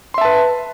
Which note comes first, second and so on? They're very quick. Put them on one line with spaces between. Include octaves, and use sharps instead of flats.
C6 E5 A5 B4